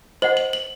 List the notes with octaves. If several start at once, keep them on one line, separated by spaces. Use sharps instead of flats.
C5 D#5 F#5 F#7
F#7
F#7